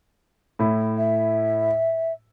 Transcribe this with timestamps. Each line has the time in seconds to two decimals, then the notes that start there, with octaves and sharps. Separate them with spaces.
0.59 A2 E4
0.97 E5